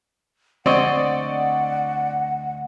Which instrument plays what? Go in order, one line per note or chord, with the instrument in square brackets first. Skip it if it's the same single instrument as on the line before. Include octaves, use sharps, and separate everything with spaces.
[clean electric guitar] D2 D#5 [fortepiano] C4 [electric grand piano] D5 C#6 [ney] F#5